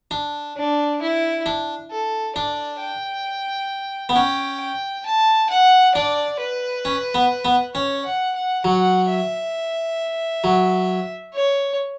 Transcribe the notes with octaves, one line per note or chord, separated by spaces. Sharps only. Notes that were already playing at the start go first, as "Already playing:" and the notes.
D4
D4
E4
D4
A4
D4 D5
G5
B3
C#4 G5
G5
A5
F#5
D4 D5
B4
C#4
B3
B3
C#4 C#5
F#5
F#5
F#3 F#5
E5
F#3
C#5